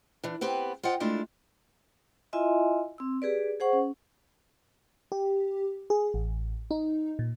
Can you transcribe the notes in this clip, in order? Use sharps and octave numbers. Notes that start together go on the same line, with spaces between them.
E3 D4
B3 C4 G4 B4
F4 C5 D#5 F#5 G5
G#3 A3 D4 E4 F4 G4
E4 F4 D#5 E5 G#5 C6
C4 E6
G4 G#4 B4 D5
G#4 C5 F#5 C#6
C#4
G4
G#4
A1
D#4
A#2